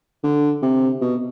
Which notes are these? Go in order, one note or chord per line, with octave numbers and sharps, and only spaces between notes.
D3
C3
B2